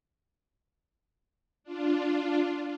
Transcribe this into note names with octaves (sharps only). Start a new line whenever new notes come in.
D4 F4